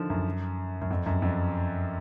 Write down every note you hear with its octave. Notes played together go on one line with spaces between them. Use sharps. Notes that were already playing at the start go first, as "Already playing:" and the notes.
Already playing: D3 D#3 F3
F#2
F#2
F2
F#2
F2